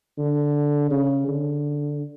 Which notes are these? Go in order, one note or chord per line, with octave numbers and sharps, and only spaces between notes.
D3
C#3
D3